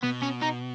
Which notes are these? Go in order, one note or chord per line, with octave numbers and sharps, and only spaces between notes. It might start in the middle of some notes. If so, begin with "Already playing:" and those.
B2 B3
C#4
D#4